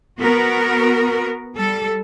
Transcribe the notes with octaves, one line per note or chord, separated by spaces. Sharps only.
B3 F#4 A#4
G3 A4